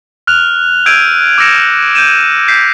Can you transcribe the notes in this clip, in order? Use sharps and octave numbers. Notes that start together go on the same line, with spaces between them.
F6 F#6 F7
E6 G6 G#6 D7 D#7
D6 E6 F6 A#6 C#7 E7
G6 D#7 E7
G6 B6 C7